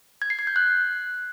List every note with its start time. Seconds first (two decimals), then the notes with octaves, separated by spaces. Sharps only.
0.22 G#6
0.30 C7
0.39 G#6
0.47 G6
0.56 F#6